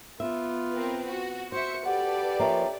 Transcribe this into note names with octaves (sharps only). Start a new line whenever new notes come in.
B3 F4 E5
C4 A#4 B4
F#4
F#4 C5 E5 C#7
G4 A4 B4 D5 F#5
F3 A#3 C#4 E5 G5 A#5